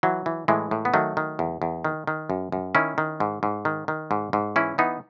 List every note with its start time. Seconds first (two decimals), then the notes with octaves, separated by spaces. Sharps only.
0.03 E3 F#3
0.26 E3
0.48 A2 E3 G#3
0.71 A2
0.85 B3
0.94 D#3 F#3 A3
1.17 D#3
1.39 E2
1.62 E2
1.85 D#3
2.07 D#3
2.30 F#2
2.52 F#2
2.75 D#3 C#4 E4
2.98 D#3
3.20 G#2
3.43 G#2
3.65 D#3
3.88 D#3
4.11 G#2
4.33 G#2
4.56 E3 C#4 E4
4.78 E3 B3 D#4